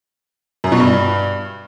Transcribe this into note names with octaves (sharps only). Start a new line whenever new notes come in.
F#2
B2
G2